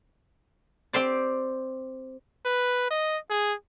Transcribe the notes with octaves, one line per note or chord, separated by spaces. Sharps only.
C4 G4 C5 D5
B4
D#5
G#4